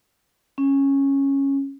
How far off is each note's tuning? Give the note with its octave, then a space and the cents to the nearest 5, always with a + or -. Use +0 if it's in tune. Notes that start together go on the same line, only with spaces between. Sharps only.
C#4 -10